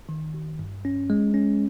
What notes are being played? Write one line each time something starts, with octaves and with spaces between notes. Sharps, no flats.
D#3
G#1
G2
C#4
G#3
C#4